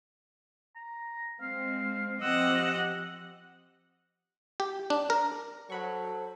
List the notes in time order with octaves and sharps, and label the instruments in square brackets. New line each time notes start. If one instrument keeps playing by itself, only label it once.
[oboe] A#5
[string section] G#3 C4 [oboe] F5
[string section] F3 C4 G4 [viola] D#5 F#5 [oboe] E6
[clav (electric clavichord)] G4
D4
A#4
[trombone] F#3 [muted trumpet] A4 [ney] C5 [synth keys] F#5 B5 C#6